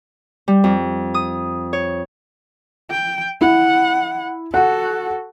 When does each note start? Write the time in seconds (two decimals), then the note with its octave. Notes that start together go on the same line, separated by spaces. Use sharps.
0.48 G3
0.64 F2
1.14 D#6
1.73 C#5
2.91 G5
3.41 E4 F#5
4.54 F#4 A4 F#5